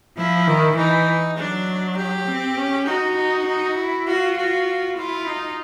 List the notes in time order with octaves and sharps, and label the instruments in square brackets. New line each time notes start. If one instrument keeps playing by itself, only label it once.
[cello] F3 [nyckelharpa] E4
[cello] D#3
[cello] E3 [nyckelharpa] D#4
[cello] F#3 [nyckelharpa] D4
[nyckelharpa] G4
[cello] C4
C#4
[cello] D#4 [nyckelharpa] F#4
[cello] D#4
D#4
E4
[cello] F4 [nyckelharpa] F#4
[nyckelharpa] F#4
[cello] E4 [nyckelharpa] F4
[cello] D#4